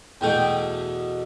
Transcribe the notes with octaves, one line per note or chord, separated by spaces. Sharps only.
E2 B2 A3 G5